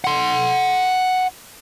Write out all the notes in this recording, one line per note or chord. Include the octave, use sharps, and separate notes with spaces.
F#5 C6